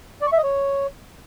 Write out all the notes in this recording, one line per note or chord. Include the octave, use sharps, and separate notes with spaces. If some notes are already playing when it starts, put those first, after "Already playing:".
D5
C#6
E5
D#5
C#5